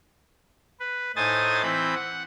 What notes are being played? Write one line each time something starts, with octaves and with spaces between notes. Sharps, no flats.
B4
A2 D#4 C5 G#5 D#6 A6
E3 C4 B5 G6
F#5